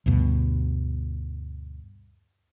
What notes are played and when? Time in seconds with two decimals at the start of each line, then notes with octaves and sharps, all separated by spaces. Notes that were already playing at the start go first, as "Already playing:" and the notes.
0.06 D2 G2 B2